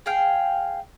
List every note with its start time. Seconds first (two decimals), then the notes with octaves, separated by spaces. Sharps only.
0.06 G#4 F5 G5